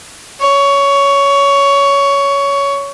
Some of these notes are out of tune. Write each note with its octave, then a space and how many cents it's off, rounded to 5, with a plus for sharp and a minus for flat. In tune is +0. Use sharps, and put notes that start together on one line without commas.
C#5 +15